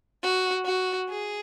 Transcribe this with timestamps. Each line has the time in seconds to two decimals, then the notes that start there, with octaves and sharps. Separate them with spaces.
0.23 F#4
0.65 F#4
1.09 G#4